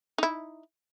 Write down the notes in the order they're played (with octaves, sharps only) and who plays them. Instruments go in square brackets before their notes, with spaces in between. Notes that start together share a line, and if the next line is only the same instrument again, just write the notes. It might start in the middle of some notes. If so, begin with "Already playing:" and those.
[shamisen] D#4 E4